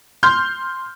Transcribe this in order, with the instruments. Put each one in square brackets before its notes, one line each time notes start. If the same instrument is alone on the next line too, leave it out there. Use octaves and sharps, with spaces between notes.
[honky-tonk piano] C6 F6 G6